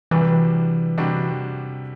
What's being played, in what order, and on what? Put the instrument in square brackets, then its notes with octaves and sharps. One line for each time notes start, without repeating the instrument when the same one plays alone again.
[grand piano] C3 G3 D4 F#4 [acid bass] E3
[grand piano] C3 G3 D4 F#4